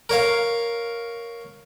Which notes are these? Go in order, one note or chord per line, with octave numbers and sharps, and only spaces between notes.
A#4 C#5 F5